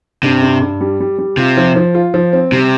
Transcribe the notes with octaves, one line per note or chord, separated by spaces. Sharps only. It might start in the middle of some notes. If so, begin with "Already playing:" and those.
G2 C3
G2
G2
G3
G3
G3
C3 F4
F3
F3
F4
F3
C4
C3 G3